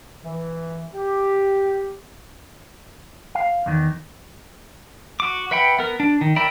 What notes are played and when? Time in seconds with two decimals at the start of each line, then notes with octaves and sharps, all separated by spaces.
0.23 E3
0.93 G4
3.35 F5
3.66 E2 D#3
5.20 F#4 D6
5.51 B4 E5 F#5 G5 B5
5.79 B3 A#4
6.00 D4
6.21 D#3
6.36 A#4 D5 E5 G5 B5